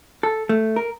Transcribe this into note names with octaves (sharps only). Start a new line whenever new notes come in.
A4
A3
A#4